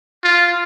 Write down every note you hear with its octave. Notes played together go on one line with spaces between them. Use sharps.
F4